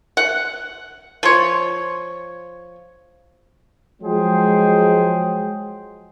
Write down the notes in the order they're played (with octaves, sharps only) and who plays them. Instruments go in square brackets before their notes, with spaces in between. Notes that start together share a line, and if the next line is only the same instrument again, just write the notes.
[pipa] F#5
F3 C#5
[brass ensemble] F3 F#3 G#3 G#4 C5 G5